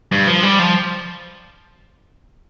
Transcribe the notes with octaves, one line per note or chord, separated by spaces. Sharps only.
G2
F3
G3
F3